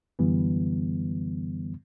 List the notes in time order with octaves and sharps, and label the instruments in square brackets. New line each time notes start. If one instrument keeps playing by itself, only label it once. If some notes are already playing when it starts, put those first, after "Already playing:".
[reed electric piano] F#2 D3 E3 G3 B3